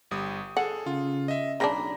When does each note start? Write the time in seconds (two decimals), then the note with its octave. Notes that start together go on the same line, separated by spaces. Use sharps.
0.11 G1 G3 D#6
0.57 G#4 A4 F#5
0.86 C#3 F4
1.28 D#5 E5
1.60 B1 C#3 C4 D4 A#5 B5 A#6